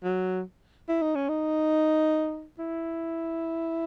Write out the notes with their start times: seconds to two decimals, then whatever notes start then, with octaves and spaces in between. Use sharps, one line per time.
0.04 F#3
0.89 E4
1.02 D#4
1.15 C#4
1.29 D#4
2.59 E4